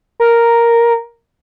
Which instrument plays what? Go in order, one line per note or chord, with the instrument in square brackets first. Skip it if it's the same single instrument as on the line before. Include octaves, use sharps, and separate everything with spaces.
[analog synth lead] A#4